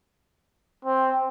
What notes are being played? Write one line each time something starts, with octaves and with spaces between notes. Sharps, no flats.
C4